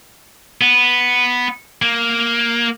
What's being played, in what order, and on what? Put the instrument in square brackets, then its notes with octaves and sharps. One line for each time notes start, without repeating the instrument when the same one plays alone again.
[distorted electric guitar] B3
A#3